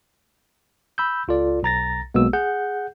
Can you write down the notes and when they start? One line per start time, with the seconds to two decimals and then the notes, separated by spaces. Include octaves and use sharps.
0.98 B5 E6 G6
1.28 C#2 F4 A4 D5
1.63 B1 A#5 A6 A#6
2.14 B1 G#3 A#3 B3 F#4 E6
2.33 G#4 F#5 G6